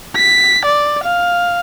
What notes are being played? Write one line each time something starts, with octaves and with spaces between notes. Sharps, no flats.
B6
D5
F5